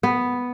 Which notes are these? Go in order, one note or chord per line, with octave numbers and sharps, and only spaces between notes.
B3